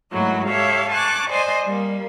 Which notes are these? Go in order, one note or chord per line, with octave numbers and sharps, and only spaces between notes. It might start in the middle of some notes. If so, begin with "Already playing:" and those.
G#2 F#3 A3 A#3 E4 F#4
G4 A4 C#5 E5 F5
G#5 A5 C#6 D6 F#6
C5 D5 D#5 G#5 C6
G3 A#3